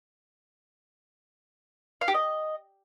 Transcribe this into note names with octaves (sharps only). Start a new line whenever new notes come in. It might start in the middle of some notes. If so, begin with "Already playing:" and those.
F5
G4
D#5